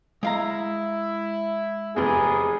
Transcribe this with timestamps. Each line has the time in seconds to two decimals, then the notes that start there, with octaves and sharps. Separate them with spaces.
0.23 G#3 E4 F5 A#5
1.96 F1 E2 G#4